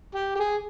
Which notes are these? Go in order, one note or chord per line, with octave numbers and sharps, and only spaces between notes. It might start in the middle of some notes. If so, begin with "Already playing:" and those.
G4
G4
G#4